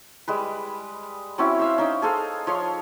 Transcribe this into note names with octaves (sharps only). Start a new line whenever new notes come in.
G3 G#3 B4
F#3 C4 C#4 E4
C5 E5 F5
C#4 D#4 G5
G#4 A4 C5 F5
F3 C#5 C6